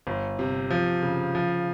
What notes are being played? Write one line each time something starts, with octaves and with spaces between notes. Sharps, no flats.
G1
C3
F3
C#3
F3